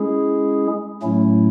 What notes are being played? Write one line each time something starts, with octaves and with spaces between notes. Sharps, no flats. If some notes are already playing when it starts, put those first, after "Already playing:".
Already playing: G#3 C#4 E4 G#4
A2 F#3 A3 C#4 E4